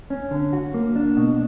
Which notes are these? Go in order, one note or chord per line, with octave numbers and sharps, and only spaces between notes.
C#4
D3
F#4
A#3
D4
B2